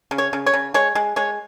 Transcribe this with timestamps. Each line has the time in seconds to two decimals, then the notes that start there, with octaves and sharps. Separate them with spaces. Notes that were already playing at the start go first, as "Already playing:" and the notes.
0.11 C#3
0.18 C#5
0.33 C#3
0.46 C#5
0.53 C#3
0.74 G#3 C#5
0.95 G#3
1.16 G#3 C#5